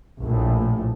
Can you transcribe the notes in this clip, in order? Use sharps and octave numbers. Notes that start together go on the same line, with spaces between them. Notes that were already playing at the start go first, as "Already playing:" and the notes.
A#1 A2